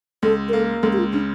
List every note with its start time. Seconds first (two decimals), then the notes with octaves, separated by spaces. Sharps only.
0.23 C#2 A4
0.49 A#4
0.53 A#3 A4
0.83 C#2 A4
0.93 G4
0.99 F4
1.13 C#3 D4